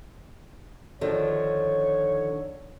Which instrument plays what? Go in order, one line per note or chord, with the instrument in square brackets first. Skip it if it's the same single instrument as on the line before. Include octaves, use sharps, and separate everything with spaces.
[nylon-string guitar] D3 D#3 F3 [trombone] C#5